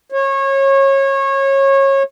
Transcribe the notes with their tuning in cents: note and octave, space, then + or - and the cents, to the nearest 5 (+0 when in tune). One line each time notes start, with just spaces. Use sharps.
C#5 -25